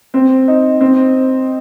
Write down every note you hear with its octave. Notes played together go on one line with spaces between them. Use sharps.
C4
D#4
C4